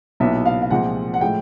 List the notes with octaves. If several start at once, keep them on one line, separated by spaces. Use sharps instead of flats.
B1 A#2 F#3 B3 E4 E5
F5
F5
C2 A#2 F3 G#3 C4 F#5
F#5
A2 F3 G#3 G5